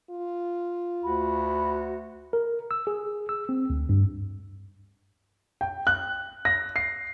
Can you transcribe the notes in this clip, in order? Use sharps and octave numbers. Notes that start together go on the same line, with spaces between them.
F4
D2 F#4 B5
A#4
E6
G#4
E6
C4
D2
G2
G5
F#6
A#6
C7